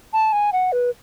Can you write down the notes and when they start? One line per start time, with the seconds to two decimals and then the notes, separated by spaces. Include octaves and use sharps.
0.13 A5
0.33 G#5
0.53 F#5
0.72 B4